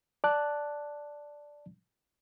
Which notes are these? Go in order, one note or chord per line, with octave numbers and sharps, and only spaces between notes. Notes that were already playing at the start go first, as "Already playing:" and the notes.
D5 A5 F#6